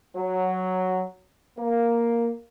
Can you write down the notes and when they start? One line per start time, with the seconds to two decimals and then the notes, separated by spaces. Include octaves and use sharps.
0.16 F#3
1.59 A#3